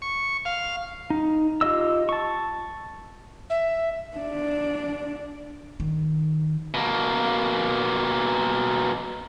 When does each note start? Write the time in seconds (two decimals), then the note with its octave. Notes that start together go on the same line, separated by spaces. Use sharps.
0.02 C#6
0.45 F5
1.10 D#4
1.61 F4 G4 D#5 E6
2.09 A5 C#6
3.50 E5
4.17 D4 D5
5.80 D#3
6.74 B2 A#3